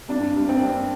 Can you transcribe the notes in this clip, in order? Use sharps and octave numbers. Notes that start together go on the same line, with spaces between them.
G2 D4
G2
C4
G2